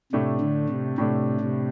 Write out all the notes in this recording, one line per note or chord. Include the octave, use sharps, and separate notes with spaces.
A2 C3 A3 D4
D3
C3
A2 C3 A3 D4
C3